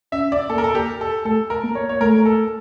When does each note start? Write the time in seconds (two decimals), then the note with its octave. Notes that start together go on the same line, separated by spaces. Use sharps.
0.12 C#4 E5
0.32 D5
0.50 A#3 A4
0.58 A#4
0.64 A4
0.75 G4
1.01 A4
1.26 A3 A4
1.50 A#4
1.64 A#3
1.75 C#5
1.89 C#5
2.01 A3 A#4
2.26 A4